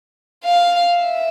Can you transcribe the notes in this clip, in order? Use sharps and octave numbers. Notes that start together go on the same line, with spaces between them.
F5
E5